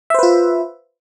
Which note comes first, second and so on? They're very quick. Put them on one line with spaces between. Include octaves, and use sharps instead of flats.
E5 C5 B4 F4